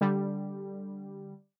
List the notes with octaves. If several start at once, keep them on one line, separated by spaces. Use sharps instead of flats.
D3 G3